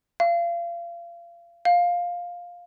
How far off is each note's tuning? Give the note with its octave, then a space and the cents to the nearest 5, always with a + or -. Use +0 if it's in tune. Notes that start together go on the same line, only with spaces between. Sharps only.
F5 -30
F5 +10